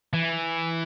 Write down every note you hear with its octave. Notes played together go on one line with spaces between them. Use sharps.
E3